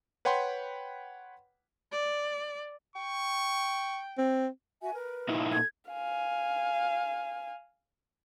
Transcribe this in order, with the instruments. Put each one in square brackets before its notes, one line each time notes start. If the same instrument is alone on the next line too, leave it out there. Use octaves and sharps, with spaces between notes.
[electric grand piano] B4 C#5 F#5 G5 B5 C6
[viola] D5
[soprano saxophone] G5 [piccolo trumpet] C#6
[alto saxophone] C4
[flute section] F#4 E5 G#5
A#4 B4
[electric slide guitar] A#2 D#4 E4
[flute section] A4 G#6
[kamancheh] F5 G#5